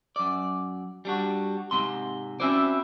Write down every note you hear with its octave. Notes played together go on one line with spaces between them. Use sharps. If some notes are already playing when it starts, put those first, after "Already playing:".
F#2 D5
G3 D4 F#4
G#2 C3 C6
C4 C#4 E4 F#4 C5 D5